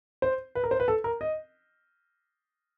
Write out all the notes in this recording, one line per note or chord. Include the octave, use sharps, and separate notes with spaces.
C5
B4
A#4
C5
B4
A4
A#4
D#5